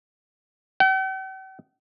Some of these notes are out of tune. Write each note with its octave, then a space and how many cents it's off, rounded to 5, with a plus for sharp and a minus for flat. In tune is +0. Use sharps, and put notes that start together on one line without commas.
G5 -45